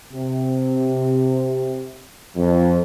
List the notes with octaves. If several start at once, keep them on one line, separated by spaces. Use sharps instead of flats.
C3
F2